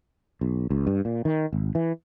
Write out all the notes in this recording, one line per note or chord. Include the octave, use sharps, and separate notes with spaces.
B1
C#2
G2
A#2
D#3
G#1
E3